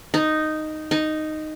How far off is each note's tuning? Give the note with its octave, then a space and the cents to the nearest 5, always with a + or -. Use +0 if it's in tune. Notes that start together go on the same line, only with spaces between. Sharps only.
D#4 -5
D#4 -5